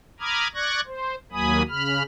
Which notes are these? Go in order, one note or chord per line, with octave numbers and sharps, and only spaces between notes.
A#5 B5 D6 D#6 F6 G#6
D5 C#6 F#6 G#6 A#6
C5
D#2 F#3 A#3 G#5 B5 D#6
C#3 B5 F6